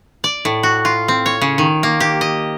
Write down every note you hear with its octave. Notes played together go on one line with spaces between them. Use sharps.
D5
A2
F#4
F4
C4
C#5
C#3
D#3
A#3
G4
D#5